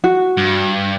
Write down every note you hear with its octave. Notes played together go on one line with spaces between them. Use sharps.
F#4
G2